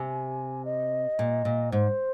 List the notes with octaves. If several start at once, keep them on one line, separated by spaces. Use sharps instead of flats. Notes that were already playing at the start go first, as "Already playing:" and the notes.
Already playing: C3 G#5
D#5
A#2
A#2
G#2 C5